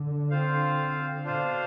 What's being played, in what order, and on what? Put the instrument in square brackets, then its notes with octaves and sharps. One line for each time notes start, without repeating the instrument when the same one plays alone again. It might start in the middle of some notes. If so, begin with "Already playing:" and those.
Already playing: [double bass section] D3
[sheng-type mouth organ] C4 F4 C5 F5
[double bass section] B2 [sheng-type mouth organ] D4 F4 C5 F5